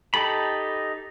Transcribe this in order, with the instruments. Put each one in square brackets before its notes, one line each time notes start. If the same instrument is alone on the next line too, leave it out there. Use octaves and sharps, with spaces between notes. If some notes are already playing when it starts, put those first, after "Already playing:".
[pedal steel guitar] D#4 G4 A4 B5